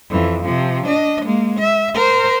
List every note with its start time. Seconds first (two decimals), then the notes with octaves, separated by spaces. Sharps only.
0.10 F2 E3
0.44 C3 F3
0.86 D4 D#5
1.25 G#3 A#3
1.59 E5
1.95 A#4 C5